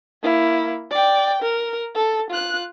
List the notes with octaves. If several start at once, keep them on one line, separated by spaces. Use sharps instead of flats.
A#3 E4
D5 G5
A#4
A4
F4 F#6